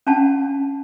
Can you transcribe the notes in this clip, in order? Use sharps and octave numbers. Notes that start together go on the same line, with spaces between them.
C#4 D4 F5 F#5 A5